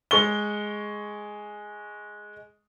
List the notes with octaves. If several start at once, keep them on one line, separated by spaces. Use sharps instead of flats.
G#3 C#6 G7